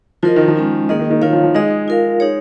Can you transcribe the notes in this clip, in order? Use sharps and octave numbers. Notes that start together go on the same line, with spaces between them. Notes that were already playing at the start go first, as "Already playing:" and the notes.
F3 F4 A#4 D#5
D#3
F3
G#3 C#4 F4
D#3 A#3 D#4 G#4 D#5
D#3
D#3
D#3 F4 C#5 F5
F3
F3
G#3 D#4 G#4 D#5
F4 A#4 F5
D#4 G#4 C#5